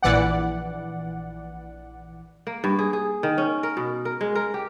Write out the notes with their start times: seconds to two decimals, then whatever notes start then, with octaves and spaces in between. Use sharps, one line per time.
0.03 A#1 E3 D5 F#5
2.47 A#3
2.64 G2
2.79 G#4
2.93 G#4
3.23 D#3
3.38 C#4
3.63 A#4
3.77 B2
4.05 A#4
4.21 G#3
4.35 A#4
4.54 G4